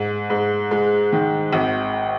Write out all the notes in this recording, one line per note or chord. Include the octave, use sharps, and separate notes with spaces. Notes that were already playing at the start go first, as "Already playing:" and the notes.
Already playing: G#2
G#2
G#3
D#3
G#1